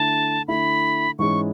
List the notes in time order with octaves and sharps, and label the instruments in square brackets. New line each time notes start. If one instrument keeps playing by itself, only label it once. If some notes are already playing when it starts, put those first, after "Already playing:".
Already playing: [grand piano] D3 A3 E4 [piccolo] A5
[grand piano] D3 A3 E4 [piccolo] B5
[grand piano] G#2 E3 G#3 C#4 [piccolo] C#6